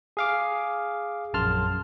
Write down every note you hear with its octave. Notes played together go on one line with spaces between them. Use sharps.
G#4 F5 D6
A#1 F#2 A5 C6 F6